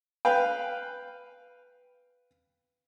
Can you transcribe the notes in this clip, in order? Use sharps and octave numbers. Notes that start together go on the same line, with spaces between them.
B4 F5 G5